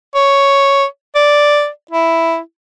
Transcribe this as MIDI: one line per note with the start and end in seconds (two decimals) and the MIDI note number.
0.15 0.84 73
1.15 1.68 74
1.91 2.39 64